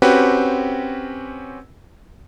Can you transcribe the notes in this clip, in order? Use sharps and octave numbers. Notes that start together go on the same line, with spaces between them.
C4 C#4 F#4 G4 B4